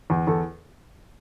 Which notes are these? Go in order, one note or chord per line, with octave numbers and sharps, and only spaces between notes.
E2
E2 A4